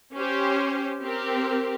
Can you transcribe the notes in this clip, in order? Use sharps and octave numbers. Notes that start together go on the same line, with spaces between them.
C#4 G4 C5
C4 G4 A#4